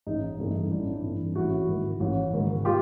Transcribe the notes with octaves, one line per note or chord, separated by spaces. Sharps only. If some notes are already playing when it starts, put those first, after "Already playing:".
A1 D#4
G2 E3 A3 C4
A1 D4 E4
G2 E3 A3 C4
A1 E4 F#4
G#2 D#3
A1
G#2 D#3
F4 G4